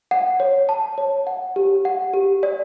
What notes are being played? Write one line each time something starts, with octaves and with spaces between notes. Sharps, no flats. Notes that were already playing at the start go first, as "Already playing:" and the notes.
F#5
C#5
A5
C#5
F#5
G4
F#5
G4
D5